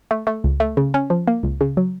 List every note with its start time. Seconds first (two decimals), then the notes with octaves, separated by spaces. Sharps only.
0.11 A3
0.27 A3
0.44 C#2
0.60 A3
0.77 C#3
0.94 C#4
1.10 F3
1.27 A#3
1.43 C#2
1.61 C#3
1.77 F#3